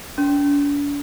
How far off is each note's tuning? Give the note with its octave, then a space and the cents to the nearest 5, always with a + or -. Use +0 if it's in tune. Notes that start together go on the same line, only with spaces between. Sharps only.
D4 -40